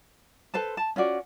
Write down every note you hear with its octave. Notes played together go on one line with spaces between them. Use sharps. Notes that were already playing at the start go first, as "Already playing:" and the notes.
A4 B4 C5 A5
A5
C#4 F4 F#4 D5